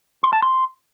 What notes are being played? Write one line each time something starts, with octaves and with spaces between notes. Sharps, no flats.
C6
A5
C6